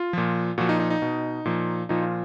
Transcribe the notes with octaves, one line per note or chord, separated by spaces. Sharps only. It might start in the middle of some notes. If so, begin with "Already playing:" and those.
Already playing: F4
A#2 F3
A#2 F3 F#4
D#4
D#4
D#4
B2
A#2 F3
A#2 F3 D#4
F4